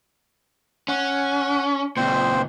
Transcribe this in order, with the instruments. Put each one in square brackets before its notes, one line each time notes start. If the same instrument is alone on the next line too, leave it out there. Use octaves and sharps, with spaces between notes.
[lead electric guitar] C#4 [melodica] F#5
[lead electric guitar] C#2 A#2 [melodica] C4 C5